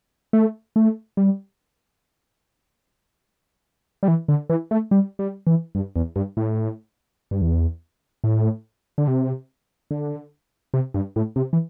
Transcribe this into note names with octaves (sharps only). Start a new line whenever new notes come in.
A3
A3
G3
G3
E3
D3
E3
A3
G3
G3
E3
G2
E2
G2
A2
G2
E2
A2
D3
C3
D3
C3
G2
A2
C3
E3